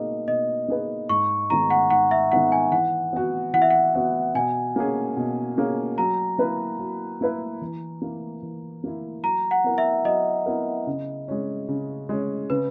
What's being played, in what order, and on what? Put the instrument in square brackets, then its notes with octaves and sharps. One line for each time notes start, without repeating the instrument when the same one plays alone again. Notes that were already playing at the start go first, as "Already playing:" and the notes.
Already playing: [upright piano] B2 A#3 D#4 G#4 [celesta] D#5
[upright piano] B2 [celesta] D#5
[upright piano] A#3 D#4 G#4 B4
[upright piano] G#2 [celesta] C#6
[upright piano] D#3 G#3 B3 D#4 [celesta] A#5
[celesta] F#5
[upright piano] G#2 [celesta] F#5
[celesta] E5
[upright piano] D#3 G#3 B3 D#4 [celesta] F#5
[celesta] G#5
[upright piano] E3 [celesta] F#5
[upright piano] B3 F#4
[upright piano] E3 [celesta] F#5
[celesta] E5
F#5
[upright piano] B3 F#4
[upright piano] B2 [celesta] G#5
[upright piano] A#3 C#4 G#4
B2
A#3 C#4 G#4
[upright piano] F#3 [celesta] A#5
[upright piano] A#3 E4 B4
F#3
A#3 E4 B4
E3
A#3 E4
E3
A#3 E4
[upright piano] F#3 [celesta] A#5
[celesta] F#5
[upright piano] B3 E4 A#4
[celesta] E5
[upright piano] F#3 [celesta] D#5
[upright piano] B3 E4 A#4
C#3
G#3 C#4
C#3
G#3 C#4
[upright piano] C#3 [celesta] B4